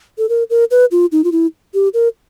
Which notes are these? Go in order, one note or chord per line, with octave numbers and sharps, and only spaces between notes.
A4
A#4
A#4
B4
F4
D#4
F4
E4
G4
A#4